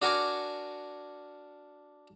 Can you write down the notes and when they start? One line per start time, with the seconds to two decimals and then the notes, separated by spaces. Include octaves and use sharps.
0.02 D4 F#4 A#4 G#5 C#6 D6